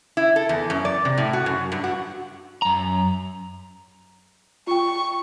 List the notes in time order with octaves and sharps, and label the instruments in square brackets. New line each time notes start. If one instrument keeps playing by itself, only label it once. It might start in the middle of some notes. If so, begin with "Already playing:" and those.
[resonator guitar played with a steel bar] E4
A4
E2
F#2
D5
C3
A2
F#4
F#2
G2
F#4
[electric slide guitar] F#2 A#5
[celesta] F4 G5 [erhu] C#6